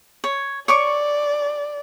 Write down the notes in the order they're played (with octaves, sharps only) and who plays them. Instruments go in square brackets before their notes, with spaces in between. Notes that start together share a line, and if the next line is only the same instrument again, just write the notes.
[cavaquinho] C#5
[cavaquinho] C#5 C#6 D6 [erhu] D5